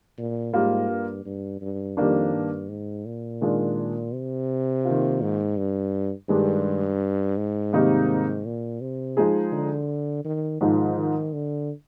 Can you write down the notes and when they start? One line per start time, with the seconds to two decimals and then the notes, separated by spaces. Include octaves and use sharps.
0.18 A#2
0.53 G#2 G3 A#3 F4 A#4
0.89 G2
1.25 G2
1.61 G2
1.97 F2 D#3 G3 A#3 D4
2.34 G2
2.69 G#2
3.05 A#2
3.41 D#3 G#3 D4 F4 A#4
4.14 C3
4.85 D#3 A#3 F4
5.22 G#2
5.57 G2
6.29 G2 D#3 G#3 D4 G4
7.37 G#2
7.73 C3 D#3 G3 A#3 D#4
8.45 A#2
8.81 C3
9.17 F3 G#3 D#4 G#4
9.52 D3
10.25 D#3
10.61 G#2 D#3 F3 G#3 D#4
10.97 D#3
11.33 D3